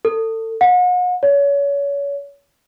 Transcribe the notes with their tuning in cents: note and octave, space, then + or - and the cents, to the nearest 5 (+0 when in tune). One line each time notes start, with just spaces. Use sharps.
A4 +30
F#5 -40
C#5 +30